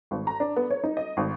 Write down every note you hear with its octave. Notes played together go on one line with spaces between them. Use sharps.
G#1
A#5
D4
B3
C#5
D#4
D#5
G#1